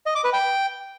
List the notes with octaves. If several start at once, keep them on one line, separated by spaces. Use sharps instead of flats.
D#5
D6
B4
G5